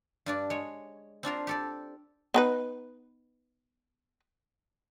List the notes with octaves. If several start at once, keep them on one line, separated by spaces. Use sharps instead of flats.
G2 D4 D5
G#3 C#5
C4 D4 F4 A#4
G4 A4 D5
B3 D#4 B4